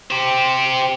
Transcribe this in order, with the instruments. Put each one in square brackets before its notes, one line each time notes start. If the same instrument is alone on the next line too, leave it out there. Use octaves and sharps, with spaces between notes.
[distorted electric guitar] G4 C5